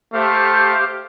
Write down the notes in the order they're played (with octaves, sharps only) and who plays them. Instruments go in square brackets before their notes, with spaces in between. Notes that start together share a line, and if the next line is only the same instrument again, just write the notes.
[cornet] A3 [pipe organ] G4 C5 F5